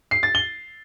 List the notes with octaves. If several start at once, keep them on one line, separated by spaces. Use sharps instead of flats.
C7
A6
G7